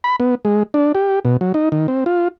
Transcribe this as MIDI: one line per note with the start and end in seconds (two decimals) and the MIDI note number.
0.04 0.16 83
0.20 0.35 59
0.45 0.63 56
0.74 0.92 62
0.95 1.19 67
1.25 1.37 47
1.41 1.52 54
1.54 1.69 63
1.72 1.87 51
1.88 2.04 60
2.06 2.28 65